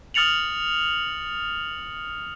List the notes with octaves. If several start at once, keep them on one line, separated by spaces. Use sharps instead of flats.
D#6 F6 A6 C#7 F7 F#7